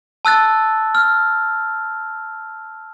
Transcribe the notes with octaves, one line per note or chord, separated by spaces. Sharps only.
A5 E6 F#6 A6
F6